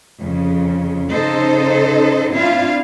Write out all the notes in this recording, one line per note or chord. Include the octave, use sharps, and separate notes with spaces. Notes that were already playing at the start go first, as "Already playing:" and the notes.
F2 C#3
C#3 D#4 A4 C5 D#5
C4 D4 E4 F4 F5